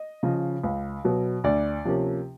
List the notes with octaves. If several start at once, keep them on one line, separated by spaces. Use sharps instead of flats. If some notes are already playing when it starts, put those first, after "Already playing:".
Already playing: D#5
C#3 F3
C#2
B2 F#3
D2 D5
C3 F3 A#3 C#4